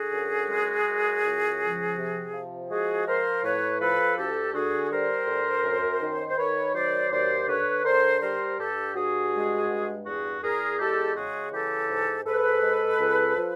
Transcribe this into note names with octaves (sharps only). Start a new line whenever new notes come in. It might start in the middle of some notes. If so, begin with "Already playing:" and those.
Already playing: D3 F#4 G#4
F#2
G#3
F#2
C#2
F3
C3
F3
G#3 F#4 G#4
F3 A#4 C5
A2 B4 C#5
F3 A4 B4
D2 G4 A4
D3 F#4 G#4
G3 A#4 C5
D2
F#2
D#3
C5
D#3 B4 C#5
F#3 C5 D5
D#2 C5 D5
D3 B4 C#5
D3 A#4 C5
G3 A#4 C5
G2 G4 A4
G2 F#4 G#4
G#3
G2
E2 F#4 G#4
E2 G#4 A#4
G#3 G4 A4
C#3 F#4 G#4
E3 G4 A4
G#2
G#2 A4 B4
G#3
C#2
F3